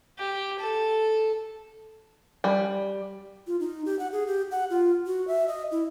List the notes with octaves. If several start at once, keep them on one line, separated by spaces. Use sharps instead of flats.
G4
A4
G3
F4
D#4
G4
F#5
G#4
G4
F#5
F4
F#4
E5
D#5
E4